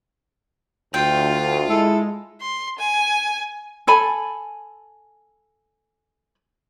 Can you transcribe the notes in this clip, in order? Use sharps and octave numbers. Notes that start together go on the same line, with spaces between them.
D2 F4 G5
G#3 E4 A4
C6
G#5
A4 G#5 A5 B5